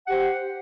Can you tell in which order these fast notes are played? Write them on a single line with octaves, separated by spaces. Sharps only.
F#5 G4 C5